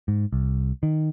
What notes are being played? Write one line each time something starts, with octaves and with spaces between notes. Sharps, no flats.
G#2
C2
D#3